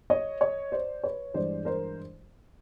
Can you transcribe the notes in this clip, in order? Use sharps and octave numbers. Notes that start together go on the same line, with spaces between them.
C#5 D#5
C#5 D#5
C5 D5
B4 C#5
G2 E3 G#3 C5 D5
A#4 C5